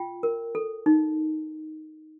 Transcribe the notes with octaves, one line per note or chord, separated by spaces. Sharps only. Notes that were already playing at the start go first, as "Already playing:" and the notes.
Already playing: F4 G5
A#4
A4
D#4